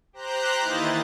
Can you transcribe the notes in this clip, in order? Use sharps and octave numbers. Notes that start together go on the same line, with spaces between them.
G4 C5 A#5 F#6 G6
D#3 E3 A#3 E4 D#5 A6